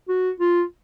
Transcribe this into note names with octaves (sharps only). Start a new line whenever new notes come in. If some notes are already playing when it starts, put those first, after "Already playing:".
F#4
F4